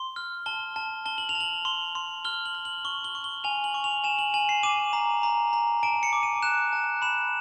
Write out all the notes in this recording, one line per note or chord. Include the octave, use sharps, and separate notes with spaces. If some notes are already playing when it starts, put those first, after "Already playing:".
Already playing: C6
F6
A5 G7
A5
A5 G7
F#7
F7
A5
F#7
C6
C6
F6 G7
F#7
F6
F#7
C#6 G7
G7
C#6
G7
G#5 F7
F#7
C#6
F7
G#5 E7
F#7
G#5 F#7
C7
D6 D#7
A#5
A#5
A#5
A5 D7
C#7
D6
D#7
F#6 E7
A5
B5 E7